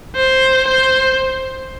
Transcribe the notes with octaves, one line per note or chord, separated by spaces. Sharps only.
C5
C5